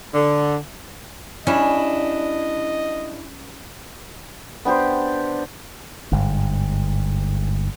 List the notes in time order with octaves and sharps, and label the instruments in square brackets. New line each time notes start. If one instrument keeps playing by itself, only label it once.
[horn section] D3
[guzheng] G3 C#4 [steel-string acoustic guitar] D4 E4 [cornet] D#5
[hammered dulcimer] B3 D4 G4 C5
[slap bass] G1 G#2